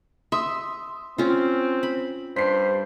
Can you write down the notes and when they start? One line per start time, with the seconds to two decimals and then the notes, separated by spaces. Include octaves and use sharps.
0.32 E5 C6 D#6
1.18 C4 C#4 F4
1.83 B5
2.36 G2 C5 B6 C7